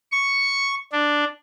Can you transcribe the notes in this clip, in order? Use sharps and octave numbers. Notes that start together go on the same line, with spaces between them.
C#6
D4